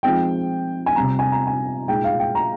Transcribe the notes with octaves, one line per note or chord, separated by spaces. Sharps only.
F3 G#3 C4 D#4 G5
G#5
C3 G3 C4 A#5
G#5
A#5
G#5
A#2 G#3 D#4 G5
F5
G5
A#5